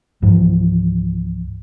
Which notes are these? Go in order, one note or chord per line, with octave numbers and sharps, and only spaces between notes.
C#2 G#2 E3 F3